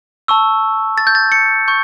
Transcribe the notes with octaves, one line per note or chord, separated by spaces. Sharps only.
A5 C#6 E6
A6
G6
A6
C#7
C#6 G6